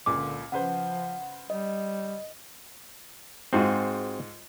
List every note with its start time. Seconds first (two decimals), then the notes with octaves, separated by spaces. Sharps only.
0.06 C#2 A#2 D3 D6
0.52 C#3 F3 B4 C5 F#5
1.50 G3 D#5
3.53 G#2 C4 F4 F#4 G#4